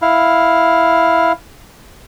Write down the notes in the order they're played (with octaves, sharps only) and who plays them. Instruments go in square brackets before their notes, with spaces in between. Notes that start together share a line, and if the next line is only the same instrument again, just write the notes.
[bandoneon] E4 F5